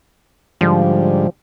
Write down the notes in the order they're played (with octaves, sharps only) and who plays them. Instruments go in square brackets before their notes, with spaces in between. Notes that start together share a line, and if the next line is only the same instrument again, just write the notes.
[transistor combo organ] G#2 D3 G3 [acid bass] F3